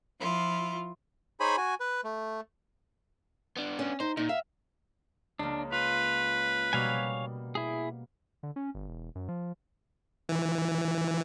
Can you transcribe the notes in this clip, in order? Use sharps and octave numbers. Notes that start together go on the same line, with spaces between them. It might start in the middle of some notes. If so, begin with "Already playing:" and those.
F3 E4 F4
D#4 G#4 C5 C#5 G#5 B5
F#4 G#5
B4
A3
B3 D4
C#4
D#4 C5
A#2 D#4
E5 F5
C#2 A#3 D4
F4 B4
B2 G3 A#3 C#5 F5 G#5
E4 G#4
D3
C#4
G1
E1
F#2
F3
E3